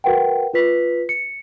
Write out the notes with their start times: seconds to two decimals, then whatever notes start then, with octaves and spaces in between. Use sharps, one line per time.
0.04 F#4 A#4 B4 F#5 G5
0.54 F4 B4 B6
1.09 C#7